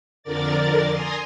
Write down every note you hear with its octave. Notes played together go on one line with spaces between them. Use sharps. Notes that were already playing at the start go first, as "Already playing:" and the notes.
F2 D3 A#4 D5 A6
G#5 A#5 C6 D#6